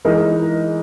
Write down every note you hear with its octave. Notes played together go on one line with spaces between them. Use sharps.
E3 G#3 D#4 A#4